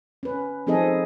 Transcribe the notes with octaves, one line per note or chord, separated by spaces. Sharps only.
C#4 B4
F3 C4 D#4 G#4 A4 D#5